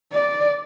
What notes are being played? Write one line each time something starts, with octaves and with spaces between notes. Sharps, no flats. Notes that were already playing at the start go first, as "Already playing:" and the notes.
D5